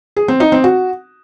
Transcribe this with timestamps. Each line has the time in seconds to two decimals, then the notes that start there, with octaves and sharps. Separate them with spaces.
0.16 G#4
0.28 C4
0.40 D#4
0.52 C4
0.64 F#4